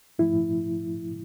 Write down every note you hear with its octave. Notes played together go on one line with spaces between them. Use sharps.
G#2 F3 A3 E4